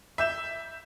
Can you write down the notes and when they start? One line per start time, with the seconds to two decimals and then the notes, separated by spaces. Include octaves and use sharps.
0.18 E5 G6 E7